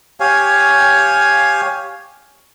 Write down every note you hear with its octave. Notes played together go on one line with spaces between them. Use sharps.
G4 C#5 F5 G#5